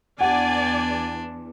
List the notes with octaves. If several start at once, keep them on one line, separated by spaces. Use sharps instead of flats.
E2 D4 D5 F#5 G#5